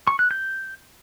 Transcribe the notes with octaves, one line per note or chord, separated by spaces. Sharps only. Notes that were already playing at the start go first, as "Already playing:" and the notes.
C#6
F#6
G6